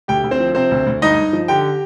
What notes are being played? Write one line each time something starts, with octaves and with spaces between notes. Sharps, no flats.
D2 G4 G5
D2
C4 C5
F3
C3 C4 C5
D2
D2
G2 D#4 D#5
G2
F3
D3 G4 G5